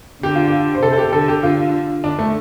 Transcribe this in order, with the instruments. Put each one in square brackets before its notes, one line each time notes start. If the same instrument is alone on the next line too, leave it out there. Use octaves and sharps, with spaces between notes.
[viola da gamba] D3 [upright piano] G4
[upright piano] F4
G4
C5
[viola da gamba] C3 [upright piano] A4
[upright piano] A4
G4
G4
[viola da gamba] D3 [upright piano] A4
[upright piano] G4
[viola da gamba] D3 [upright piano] F4
[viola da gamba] D3 [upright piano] D4
[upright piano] A3